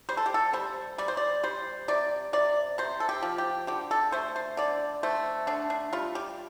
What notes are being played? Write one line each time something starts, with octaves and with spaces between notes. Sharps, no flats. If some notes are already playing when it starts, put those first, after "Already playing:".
G3 C5
A4
G4
A4
G3 C5
G3 D5
C5
D5
G3 C5
C3 D5
C3 D5
C3 C5
A4
G4
F3
G4
D3 G4
A4
A3 C5
C5
D3 D5
A3 C5
D3 D4
D4
G3 F4
G4